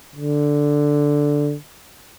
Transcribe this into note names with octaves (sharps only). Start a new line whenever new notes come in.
D3